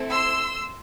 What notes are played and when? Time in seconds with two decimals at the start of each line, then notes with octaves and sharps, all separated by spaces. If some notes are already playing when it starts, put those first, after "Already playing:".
Already playing: A3 C4 E4 A4
0.11 C6 E6